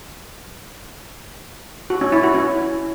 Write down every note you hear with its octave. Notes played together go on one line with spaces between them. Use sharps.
F#4
C#4
E4
F#4
C#4